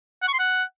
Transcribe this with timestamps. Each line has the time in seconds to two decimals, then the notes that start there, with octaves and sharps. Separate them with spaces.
0.22 F#5
0.28 C#6
0.33 C6
0.39 F#5